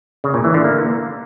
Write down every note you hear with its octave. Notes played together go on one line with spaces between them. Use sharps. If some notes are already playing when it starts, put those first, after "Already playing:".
C#3
A#2
E3
D3
A#3